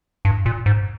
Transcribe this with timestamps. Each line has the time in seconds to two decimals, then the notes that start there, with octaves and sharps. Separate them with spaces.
0.25 G2
0.46 A#2
0.66 G#2